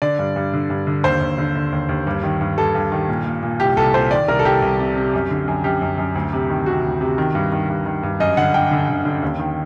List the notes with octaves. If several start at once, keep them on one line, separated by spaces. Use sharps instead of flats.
D3 D5
G2
G2
D3
G2
D3
D#2 C5
D#2
D3
D3
D#2
D#2
G2
D#3
G2
G2 A4
G2
D#3
A#2
A#2
A#2
C2 G4
C2 A4
A#2 C5
D#3 D5
C2 A#4
A4
C2 G4
C2
C3
C3
F#2
D3
F#2
F#2 G4
F#2
F#2
D2
C3
D#3
C3 F#4
D2
C3
D#3
G2
D#3
G2
D#3
G2
F#2 D#5
D3 F#5
D3 G5
D3
D3
D3
D#2
D#3